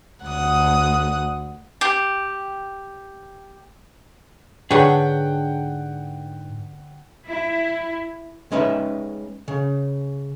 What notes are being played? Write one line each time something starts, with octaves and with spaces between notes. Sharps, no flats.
D2 F#5 D#6
G4 G5
G#2 D3 D4 G#4 B4 C#5 F#5 G5
E4
G#3 C#4 D#4 B4 E5
C#3